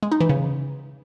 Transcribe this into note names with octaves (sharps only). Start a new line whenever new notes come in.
G#3
D#4
E3
C#3